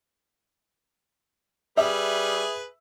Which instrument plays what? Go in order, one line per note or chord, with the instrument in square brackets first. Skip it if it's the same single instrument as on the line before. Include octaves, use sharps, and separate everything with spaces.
[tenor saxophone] G3 [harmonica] G#4 B4 [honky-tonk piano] E5